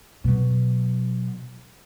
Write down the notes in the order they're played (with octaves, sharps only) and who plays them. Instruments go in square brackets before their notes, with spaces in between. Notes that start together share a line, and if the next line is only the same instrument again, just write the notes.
[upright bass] B2 F#3